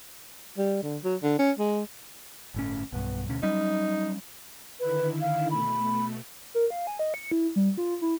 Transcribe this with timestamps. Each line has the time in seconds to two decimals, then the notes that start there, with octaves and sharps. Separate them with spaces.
0.58 G3
0.83 D3
1.04 F#3
1.22 D3
1.39 C#4
1.59 G#3
2.54 G1 A2 C#4
2.93 B1 G2 B3
3.28 D2 B2 C#4
3.43 F#3 G3 C#4 D#4
4.80 D3 D#3 E4 B4
5.21 F5
5.51 B2 A3 B5
6.54 A#4
6.70 F5
6.87 G#5
6.99 D#5
7.14 C#7
7.31 E4
7.56 G3
7.77 F4
8.02 E4